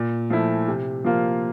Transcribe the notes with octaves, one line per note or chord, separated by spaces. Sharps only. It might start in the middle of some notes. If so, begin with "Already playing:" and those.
Already playing: A#2
F3 A3 E4
C3
F3 A#3 F4